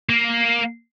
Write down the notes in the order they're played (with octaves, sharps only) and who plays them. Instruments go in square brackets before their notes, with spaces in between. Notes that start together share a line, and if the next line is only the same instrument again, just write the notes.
[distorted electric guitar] A#3